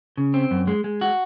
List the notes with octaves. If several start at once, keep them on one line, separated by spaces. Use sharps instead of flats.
C#3
C4
F#2
G#3
G#3
F#4